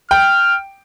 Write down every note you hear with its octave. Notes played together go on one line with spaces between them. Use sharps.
G5 F6